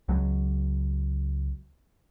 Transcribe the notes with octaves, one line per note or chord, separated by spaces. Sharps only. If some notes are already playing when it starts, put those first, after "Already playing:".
C#2 F#3